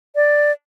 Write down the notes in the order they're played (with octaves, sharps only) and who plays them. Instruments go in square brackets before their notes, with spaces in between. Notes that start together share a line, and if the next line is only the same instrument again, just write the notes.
[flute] D5